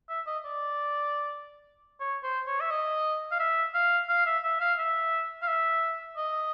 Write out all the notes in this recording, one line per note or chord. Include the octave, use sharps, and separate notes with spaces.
E5
D#5
D5
C#5
C5
C#5
E5
D#5
F5
E5
F5
F5
E5
E5
F5
E5
F5
E5
D#5